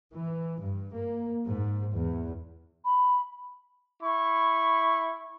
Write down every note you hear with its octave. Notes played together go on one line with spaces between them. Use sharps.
E3
G2
A#3
G#2
E2
B5
E4 B5 C#6